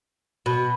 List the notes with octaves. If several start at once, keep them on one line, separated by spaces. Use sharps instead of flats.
B2